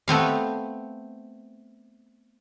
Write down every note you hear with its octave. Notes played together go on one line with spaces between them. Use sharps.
A3 B3 C4 F5